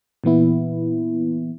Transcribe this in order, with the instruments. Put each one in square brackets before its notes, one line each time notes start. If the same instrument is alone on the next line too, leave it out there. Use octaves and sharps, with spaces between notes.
[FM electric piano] A#2 E3 B3 E4